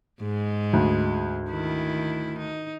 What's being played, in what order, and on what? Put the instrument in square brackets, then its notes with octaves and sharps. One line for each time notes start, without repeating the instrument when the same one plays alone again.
[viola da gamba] G#2 G#3
[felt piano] D2
[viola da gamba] D#3 E4
D#4